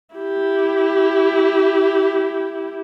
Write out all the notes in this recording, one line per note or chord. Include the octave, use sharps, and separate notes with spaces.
E4 G4